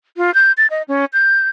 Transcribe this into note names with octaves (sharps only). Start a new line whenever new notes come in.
F4
G6
A6
D#5
C#4
G6